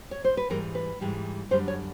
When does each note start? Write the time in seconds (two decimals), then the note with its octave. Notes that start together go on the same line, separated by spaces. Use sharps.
0.11 C#5
0.24 C5
0.37 B4
0.50 G#2 E3 G3 A#4
0.75 B4
1.01 G#2 E3 G3
1.51 F#2 D3 G3 C5
1.68 C#5